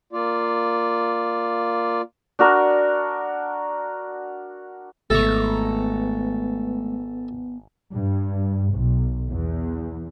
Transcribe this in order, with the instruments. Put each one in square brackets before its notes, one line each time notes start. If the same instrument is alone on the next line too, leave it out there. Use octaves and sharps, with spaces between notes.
[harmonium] A#3 F4 D5
[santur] D4 F#4 A#4
[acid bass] G#1 [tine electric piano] G#3 A3 [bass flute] B3 [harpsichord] A4 A#5 C#6
[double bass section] G2
B1
E2